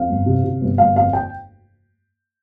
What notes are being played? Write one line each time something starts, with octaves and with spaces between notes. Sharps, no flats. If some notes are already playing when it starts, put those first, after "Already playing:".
Already playing: F2 F5
G1
C3
C3
G1
G1 F5
F2 F5
G5